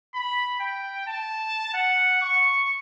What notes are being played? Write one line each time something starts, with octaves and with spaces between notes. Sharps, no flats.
B5
G5
A5
F#5
C#6